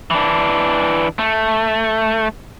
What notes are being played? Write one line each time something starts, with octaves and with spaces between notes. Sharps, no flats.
E3 D4
A3